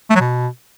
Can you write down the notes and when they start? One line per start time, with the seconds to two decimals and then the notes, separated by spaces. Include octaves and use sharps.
0.10 A3
0.15 F#3
0.20 B2